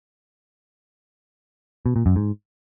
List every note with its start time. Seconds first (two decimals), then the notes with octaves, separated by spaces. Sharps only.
1.86 B2
1.96 A#2
2.06 F#2
2.16 G#2